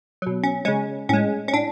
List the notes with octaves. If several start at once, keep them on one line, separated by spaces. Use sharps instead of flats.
B2 F#3
C#4
C#3 G#3 C#4
A2 G#3 C#4
C#4
A2 D4